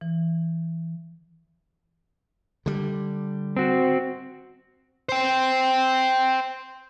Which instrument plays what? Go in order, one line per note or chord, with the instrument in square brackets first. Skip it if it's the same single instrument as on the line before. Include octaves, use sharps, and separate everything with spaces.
[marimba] E3
[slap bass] D3 G3
[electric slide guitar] C4 F#4
[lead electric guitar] C5 G5